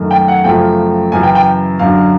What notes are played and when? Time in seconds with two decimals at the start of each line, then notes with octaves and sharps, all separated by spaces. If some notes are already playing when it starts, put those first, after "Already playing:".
Already playing: F#2 D#3 F#3 A3
0.11 G5
0.28 F#5
0.44 F#2 C#3 F3 A3 G5
1.12 F#2 C#3 E3 G#5
1.23 G5
1.35 G5
1.79 F#2 D3 F#3 F5